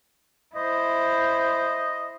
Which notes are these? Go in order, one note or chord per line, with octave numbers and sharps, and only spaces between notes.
E4 C5 D#5